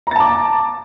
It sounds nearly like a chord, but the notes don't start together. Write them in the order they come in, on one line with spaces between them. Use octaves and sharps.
A#5 A6 A5 D6